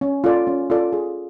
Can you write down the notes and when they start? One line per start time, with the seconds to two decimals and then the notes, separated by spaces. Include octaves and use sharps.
0.01 C#4
0.24 F4 A4 D5
0.47 C#4
0.70 F4 A4 D5
0.93 G#4